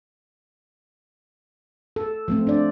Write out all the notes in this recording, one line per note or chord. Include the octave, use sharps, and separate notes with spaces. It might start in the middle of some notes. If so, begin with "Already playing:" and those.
A4
F3 A3 C4
D4 D5